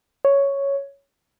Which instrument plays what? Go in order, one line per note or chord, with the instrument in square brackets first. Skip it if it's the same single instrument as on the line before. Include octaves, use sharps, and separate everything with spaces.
[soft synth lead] C#5